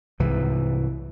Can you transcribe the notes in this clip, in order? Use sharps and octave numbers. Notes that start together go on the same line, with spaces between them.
C2 G#2 E3